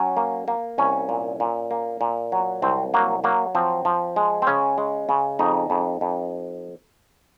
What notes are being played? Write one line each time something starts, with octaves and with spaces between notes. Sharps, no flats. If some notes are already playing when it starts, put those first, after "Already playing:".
Already playing: F#3 C#4
A#3
A#3
C2 C#4
A#2
A#2
A#3
A#2
F#3
C2 C4
F#3 A#3
F#3 A#3
F3 C4
F3
G#3
C4
C#3 C#4
G#3
C#3
F2 D#4
F2
F2